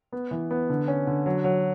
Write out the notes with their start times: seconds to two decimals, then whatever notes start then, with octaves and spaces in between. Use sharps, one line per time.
0.12 B3
0.31 E3
0.51 B3
0.69 D3
0.88 C#4
1.07 D3
1.26 F#3
1.44 F#3